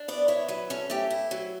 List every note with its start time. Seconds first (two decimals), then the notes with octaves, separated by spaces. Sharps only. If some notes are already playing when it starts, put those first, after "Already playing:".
Already playing: D4
0.08 B3 D5
0.28 E4 C#5
0.48 F#3 B4
0.70 C#4 A4
0.90 A3 G4
1.10 E4
1.31 F#3